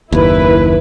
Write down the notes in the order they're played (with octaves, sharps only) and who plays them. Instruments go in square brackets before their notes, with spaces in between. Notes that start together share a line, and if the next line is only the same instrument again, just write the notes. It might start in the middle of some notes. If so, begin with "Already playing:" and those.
[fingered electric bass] F#1 D#2 [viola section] E4 B4